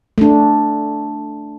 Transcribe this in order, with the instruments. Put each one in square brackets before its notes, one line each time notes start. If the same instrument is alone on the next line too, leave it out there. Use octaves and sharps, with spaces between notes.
[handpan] A3 D4